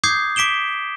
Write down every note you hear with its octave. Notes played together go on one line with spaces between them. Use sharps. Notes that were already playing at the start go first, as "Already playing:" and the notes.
D6 D#6 G6 G#6 C7
D6 B6 D7 E7 G7